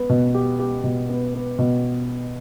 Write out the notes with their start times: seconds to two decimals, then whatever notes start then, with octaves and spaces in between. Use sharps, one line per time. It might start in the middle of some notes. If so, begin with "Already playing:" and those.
Already playing: B3
0.09 B2
0.34 G4
0.59 G4
0.84 B2
1.09 B3
1.35 B3
1.59 B2